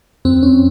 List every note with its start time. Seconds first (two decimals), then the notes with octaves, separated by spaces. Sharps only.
0.25 F2 C4
0.43 C#4